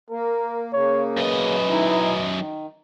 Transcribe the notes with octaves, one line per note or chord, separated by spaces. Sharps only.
A#3 A#4
C#3 A#3 C#5
F#2 B4 D#5
D#4 E4
D#3